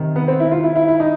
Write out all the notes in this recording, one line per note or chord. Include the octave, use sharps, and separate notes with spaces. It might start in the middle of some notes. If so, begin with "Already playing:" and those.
Already playing: C3 D#3
B3
C4
E4
F4
E4
E4
E4
D#4